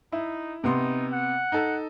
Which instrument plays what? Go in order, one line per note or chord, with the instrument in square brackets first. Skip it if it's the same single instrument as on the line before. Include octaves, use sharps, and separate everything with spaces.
[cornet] D#4 [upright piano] E4
[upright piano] C3 B3 C6 [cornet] D#4
[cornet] F#5
[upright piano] D#4 A4